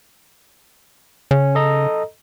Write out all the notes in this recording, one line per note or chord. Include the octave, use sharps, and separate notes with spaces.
C#3 C#4
A4 D#5 A#5